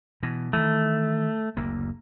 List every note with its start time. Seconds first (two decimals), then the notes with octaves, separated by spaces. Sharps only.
0.23 B2 E3
0.53 D#3 E3 A3
1.57 F#1 D2 A#3